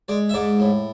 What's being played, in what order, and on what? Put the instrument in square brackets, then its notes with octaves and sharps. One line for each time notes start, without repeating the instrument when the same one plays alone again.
[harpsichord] G#3 D5
E5
G#2 D5
A2